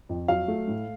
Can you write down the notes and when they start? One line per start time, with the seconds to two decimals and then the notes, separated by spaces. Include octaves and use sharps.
0.09 F2
0.28 F#3 F5
0.48 A3
0.67 A2